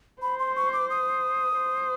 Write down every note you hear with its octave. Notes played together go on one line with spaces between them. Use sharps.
C5 B5
C6
C#6
D6
D#6
C5